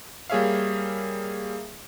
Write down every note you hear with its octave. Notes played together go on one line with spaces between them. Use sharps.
G3 A#3 G#4 C#5 E5 F5